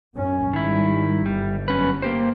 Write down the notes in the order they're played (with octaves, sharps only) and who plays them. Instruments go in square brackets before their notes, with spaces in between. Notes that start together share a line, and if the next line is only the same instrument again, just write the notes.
[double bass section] F#2 C#4
[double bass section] G#1 G3 [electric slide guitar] D#3 E4
[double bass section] G1 [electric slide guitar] G3
[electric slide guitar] F#2 C#4 B4
A#3 G4 C5